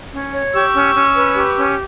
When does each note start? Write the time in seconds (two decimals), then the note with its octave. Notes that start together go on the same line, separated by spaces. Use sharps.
0.12 C#4
0.33 C#5
0.53 G4 C#6 E6
0.73 C#4
0.94 C#4
1.14 B4
1.35 G4
1.56 C#4